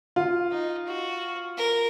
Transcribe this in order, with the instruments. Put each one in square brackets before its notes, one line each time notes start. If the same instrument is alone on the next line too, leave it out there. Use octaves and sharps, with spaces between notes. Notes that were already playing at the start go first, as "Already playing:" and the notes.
[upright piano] F4
[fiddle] D#4
F#4
A#4